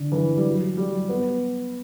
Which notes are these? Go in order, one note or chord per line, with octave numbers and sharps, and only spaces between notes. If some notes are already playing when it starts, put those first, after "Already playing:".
Already playing: D3
E3
G3
F#3
G3
B3